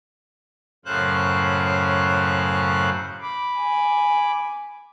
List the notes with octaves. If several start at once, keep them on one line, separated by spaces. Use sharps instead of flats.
F#2 A2 C#3 C5 F5 F#6
B5 D6
G#5